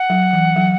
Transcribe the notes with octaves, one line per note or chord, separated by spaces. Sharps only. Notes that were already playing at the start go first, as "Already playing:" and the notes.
Already playing: F#5
F#3
E3
F#3